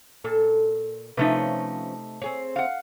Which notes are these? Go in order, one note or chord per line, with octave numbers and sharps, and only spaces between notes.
A#2 A4
C3 F3 A3 C#4 D#4 B4
C4 G#4 C#5
F5 F#5